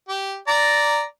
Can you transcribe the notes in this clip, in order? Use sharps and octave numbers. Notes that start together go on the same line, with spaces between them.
G4
D5 A#5